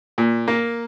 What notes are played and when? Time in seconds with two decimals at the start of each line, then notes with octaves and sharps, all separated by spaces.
0.18 A#2
0.48 A#3